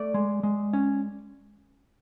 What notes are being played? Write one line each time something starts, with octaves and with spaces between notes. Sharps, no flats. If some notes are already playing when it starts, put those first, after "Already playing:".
Already playing: A3 D5
G#3
G#3
C#4